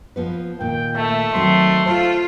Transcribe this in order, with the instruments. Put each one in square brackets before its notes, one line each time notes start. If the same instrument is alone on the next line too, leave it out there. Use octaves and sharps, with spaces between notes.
[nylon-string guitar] F3 B3 B4
[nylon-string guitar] A#2 D#3 [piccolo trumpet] G5
[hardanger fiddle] A3 [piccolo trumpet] E5
[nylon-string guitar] D#3 F#3 C4 [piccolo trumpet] C6
[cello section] F4 [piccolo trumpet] A4 [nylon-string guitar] C5